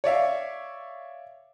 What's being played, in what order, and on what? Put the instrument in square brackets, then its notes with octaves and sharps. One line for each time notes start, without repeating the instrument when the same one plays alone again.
[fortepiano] C#5 D5 E5 F5